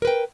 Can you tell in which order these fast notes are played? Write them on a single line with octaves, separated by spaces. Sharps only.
A#4 B4 G5